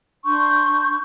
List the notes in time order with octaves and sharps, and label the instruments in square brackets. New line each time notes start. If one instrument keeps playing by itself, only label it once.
[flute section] D4 C6 C#6 G6